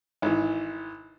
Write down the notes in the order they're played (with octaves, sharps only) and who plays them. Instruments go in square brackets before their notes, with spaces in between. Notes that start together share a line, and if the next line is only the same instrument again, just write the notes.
[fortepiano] G#1 E3